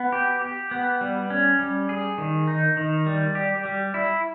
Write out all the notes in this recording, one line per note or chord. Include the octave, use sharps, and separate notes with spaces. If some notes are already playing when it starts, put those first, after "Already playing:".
Already playing: B3
G4
G4
B3
G3
C#4
G3
G#4
D#3
D#4
D#3
G3
G4
G3
E4